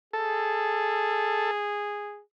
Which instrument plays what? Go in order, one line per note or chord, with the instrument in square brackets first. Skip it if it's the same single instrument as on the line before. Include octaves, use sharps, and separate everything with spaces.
[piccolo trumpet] G#4 [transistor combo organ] A4